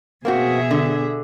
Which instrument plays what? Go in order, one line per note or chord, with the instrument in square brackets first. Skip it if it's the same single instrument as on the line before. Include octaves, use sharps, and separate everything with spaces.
[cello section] B2 G#4 E5 [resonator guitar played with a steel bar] A#3 C4 F#4
[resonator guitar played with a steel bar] D3